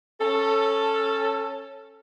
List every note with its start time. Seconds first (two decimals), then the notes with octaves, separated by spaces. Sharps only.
0.20 C#4 A4